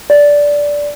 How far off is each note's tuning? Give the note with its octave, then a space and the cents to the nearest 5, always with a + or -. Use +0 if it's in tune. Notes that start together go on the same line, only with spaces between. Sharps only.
D5 -10